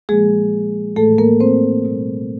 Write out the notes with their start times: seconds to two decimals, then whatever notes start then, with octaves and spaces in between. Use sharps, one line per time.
0.09 A#2 F3 G#3 A#3 G#4
0.96 A2 E3 A3 A4
1.18 A#3 A#4
1.40 C4 C5
1.84 B2 G3 A#3